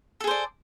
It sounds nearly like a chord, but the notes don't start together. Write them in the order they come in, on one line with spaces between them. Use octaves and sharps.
A4 G#4 C5 D5